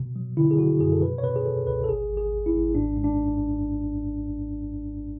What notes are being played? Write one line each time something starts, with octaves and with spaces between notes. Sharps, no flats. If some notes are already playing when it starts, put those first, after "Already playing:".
Already playing: B2
F#3
D3 E4
G#4
F#3 F#4
F#2 G#4
A4
B2 B4
C#5
B2 B4
G#4
B2 A4
C#2 B4
A4
G#1 G#4
G#1
G#4
G#1
E4
G#1
G#2 D4
G#2
D4